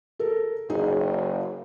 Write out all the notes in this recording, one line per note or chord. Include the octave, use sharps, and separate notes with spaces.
A4 A#4
F#1 D#4 G#4